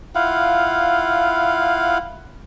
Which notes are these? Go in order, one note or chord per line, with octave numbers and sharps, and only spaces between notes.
E4 F4 F5 F#5